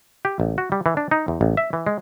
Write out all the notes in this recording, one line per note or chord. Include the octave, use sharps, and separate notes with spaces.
G4
A1
F#4
G3
E3
D4
D#4
E2
A1
E5
E3
G#3